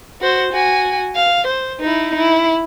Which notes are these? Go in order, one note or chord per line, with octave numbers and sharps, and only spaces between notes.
F#4 C5
F#4 G#5
F5
C5
D#4 E4
E4